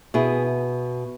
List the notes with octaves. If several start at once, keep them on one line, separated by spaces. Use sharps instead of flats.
B2 E4 G#4